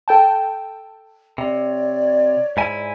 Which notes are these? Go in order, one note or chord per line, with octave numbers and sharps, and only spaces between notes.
A4 G5 A5
C3 C#5 D5
G#2 E4 G#5